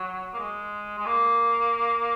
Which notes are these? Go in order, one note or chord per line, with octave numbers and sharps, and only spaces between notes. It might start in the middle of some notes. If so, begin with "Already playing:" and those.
Already playing: F#3
A#3
G#3
G#3
A#3